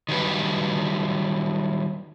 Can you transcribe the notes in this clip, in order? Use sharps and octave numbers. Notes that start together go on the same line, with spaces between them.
D#3 F#3 G3 B4